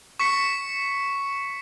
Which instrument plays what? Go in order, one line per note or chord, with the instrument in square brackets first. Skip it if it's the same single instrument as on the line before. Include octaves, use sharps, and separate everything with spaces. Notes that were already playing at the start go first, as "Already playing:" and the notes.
[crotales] C#6 B6 C#7